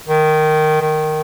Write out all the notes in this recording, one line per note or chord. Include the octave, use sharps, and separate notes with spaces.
D#3
D#3